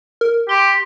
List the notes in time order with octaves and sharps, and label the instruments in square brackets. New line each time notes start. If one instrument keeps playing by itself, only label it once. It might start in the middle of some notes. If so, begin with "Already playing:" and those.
[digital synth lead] A#4
[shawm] G4 [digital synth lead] C6